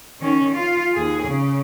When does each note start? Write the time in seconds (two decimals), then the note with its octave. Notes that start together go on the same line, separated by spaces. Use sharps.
0.20 D#3 C#4
0.54 F4
0.95 D#2 G#4
1.28 C#3